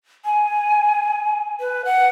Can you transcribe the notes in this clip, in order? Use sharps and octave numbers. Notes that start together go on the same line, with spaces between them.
G#5
B4
F#5